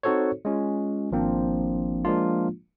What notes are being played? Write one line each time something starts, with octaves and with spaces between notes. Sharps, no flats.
C4 D#4 F#4 A4 C5 C#5
G#3 C#4 F4
G#1 F3 A#3 C4 D4
F3 G#3 A#3 D4 F4